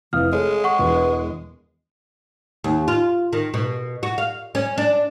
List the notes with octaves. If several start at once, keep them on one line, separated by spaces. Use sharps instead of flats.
F1 E3 F5 D#6 F6
G#3 G#4 A4 C#5
F#5 C#6
E1 E3 B4
D#2
F4
D#3
B2
F#4
F5
C#4
D4